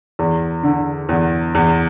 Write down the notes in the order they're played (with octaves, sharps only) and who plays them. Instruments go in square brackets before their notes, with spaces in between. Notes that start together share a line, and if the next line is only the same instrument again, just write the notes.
[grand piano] E2
D3
E2
E2